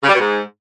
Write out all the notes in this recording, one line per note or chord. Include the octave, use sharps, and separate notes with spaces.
C#3
G3
B2
G#2